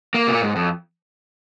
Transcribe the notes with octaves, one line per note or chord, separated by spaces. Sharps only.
A#3
C3
A#2
G#2
F2